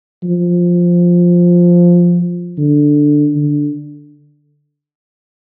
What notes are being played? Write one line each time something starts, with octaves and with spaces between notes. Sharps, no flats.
F3
D3
D3